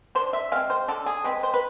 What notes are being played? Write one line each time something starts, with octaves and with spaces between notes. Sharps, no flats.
D3 C5
E5
G#3 C4 F5
C5
D3 A4
G#4
G#3 C4 B4
C5
B4